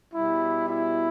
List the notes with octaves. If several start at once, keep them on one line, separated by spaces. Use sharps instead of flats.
B2 G3 E4
E4